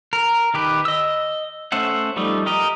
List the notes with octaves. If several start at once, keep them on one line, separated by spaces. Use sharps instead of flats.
A#4
D#3 G4 B4
D#5 E6
A3 C#4 C5 E5 F#5
F3 G3 A3 D#4
G4 A#4 D#5